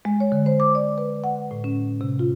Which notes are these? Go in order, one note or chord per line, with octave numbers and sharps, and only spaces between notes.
G#3
C#5
D3
C5
D6
D5
B4
F#5
A2
C#4
C3
F4